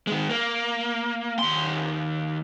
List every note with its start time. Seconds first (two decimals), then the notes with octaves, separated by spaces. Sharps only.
0.07 D#3 G#3
0.29 A#3
1.39 D#2 C6